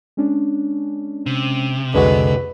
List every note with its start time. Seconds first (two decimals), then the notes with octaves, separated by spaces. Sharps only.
0.17 G#3 C#4 D4
1.26 C3
1.94 C2 F2 D3 G#3 F#4 B4